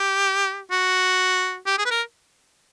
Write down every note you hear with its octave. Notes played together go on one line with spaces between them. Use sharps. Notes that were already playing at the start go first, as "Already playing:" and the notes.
Already playing: G4
F#4
G4
G#4
B4
A#4